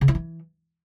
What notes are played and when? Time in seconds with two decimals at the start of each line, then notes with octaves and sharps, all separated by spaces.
0.01 C#3
0.08 E4
0.15 E3